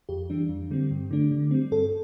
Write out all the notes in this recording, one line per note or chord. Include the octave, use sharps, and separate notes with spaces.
F2 G4
E3 G3 D4
F2
D3 G3 C4
G2
D3 A3 D4
D3
G3 C4
G2 A4